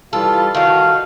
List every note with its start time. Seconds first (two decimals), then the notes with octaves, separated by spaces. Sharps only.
0.13 E3 G3 F4 A4
0.55 D#3 A3 F#4 F5